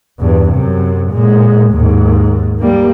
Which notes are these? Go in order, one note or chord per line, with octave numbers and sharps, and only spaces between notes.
E2 G2
F#2 C3
A#2 G#3
D#2 G#2
G3 A#3